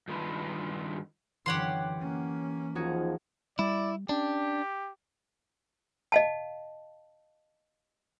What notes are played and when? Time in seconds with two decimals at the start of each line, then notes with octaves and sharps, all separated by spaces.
0.08 G2 D#3 F4 B4
1.46 F#2 D3 E3 G4 C#5 F#5 C6
2.00 A#3 C#4
2.75 D#2 F3 D#4 F#4 G#4
3.59 G3 E4 D5
4.09 C#4 D4 G4
6.12 D#5 F5 A5